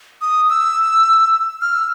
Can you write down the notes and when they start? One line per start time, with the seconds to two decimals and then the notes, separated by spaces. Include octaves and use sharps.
0.21 D#6
0.50 E6
1.61 F6
1.74 E6